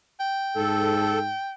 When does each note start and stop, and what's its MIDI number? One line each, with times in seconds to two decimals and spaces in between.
0.20 1.52 79
0.56 1.33 44
0.56 1.19 69